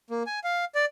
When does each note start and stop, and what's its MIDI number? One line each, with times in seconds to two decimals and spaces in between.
0.10 0.23 58
0.27 0.39 80
0.44 0.65 77
0.75 0.85 74